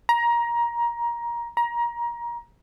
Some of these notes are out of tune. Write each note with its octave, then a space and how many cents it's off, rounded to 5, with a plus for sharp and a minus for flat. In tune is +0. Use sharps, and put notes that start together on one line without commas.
A#5 +20
A#5 +25